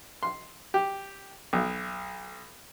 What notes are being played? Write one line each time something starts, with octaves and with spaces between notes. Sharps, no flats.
C6
G4
B1